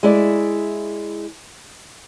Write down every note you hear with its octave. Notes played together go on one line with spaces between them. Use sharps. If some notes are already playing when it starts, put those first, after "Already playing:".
G#3 E4 D5